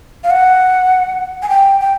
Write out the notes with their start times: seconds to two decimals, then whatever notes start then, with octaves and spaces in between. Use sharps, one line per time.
0.24 F5
0.30 F#5
1.42 G#5
1.49 G5
1.80 G5